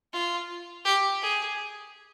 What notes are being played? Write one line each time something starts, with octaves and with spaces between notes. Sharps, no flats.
F4
G4
G#4